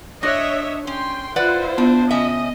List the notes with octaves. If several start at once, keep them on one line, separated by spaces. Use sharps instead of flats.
D4 C#5 D#5 E5 A#6
C#4 G5 C6
E4 F4 B4 C5 D5 F#5
B3 D4
C#3 C#4 D#5 E5